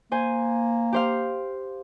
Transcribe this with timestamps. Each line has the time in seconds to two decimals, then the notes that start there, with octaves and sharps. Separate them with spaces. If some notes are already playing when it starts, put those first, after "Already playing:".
0.12 A#3 C5 G#5
0.93 G4 C5 F5